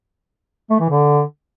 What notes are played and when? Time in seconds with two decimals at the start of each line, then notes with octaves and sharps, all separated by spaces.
0.70 A3
0.80 E3
0.90 D3